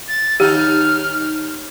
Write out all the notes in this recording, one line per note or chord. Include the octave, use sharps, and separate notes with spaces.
A6
D#2 D#4 G4 F6